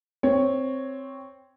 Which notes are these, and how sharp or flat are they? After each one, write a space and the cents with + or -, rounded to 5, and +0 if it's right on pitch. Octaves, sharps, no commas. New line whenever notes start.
C4 +0 C#5 +0